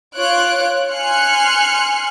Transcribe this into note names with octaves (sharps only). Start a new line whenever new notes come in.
F4 C#5 F#6 D7
G#5 C6 F6 F#6 C#7